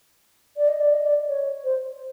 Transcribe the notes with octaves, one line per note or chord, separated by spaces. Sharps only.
D5
D#5
D5
D#5
D5
C#5
C5